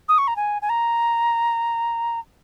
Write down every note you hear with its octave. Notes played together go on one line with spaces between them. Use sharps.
D#6
C#6
A#5
G#5
G#5
A#5